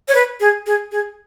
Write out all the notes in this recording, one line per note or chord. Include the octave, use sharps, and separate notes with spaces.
C#5
B4
G#4
G#4
G#4